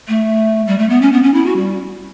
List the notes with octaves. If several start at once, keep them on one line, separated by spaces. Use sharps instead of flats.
A3
G3
A3
B3
C#4
B3
C#4
E4
F#4
G3